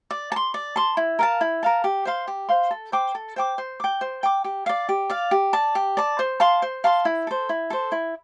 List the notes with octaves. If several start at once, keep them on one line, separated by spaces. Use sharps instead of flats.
D5
A5
C6
D5
A5 C6
E4
A#4 F5 A5
E4
A#4 F5 A5
G4
C5 F5 C6
G4
C5 F5 C6
A4
C5 G5 D6
A4
C5 G5 D6
C5
G5 D6
C5
G5 D6
G4
D5 F5
G4
D5 F5
G4
D5 A5
G4
D5 A5
C5
F5 A5 C6
C5
F5 A5 C6
E4
A4 C5
E4
A4 C5
E4